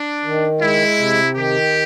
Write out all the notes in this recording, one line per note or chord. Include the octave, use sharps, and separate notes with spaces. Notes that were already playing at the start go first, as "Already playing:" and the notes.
Already playing: D4
D#3
G#3 E4
C3
D#3 G4